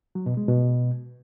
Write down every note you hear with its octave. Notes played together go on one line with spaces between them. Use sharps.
F#3
B2
G#3
B2